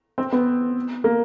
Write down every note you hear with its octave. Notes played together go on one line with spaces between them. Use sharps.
C4
B3
A#3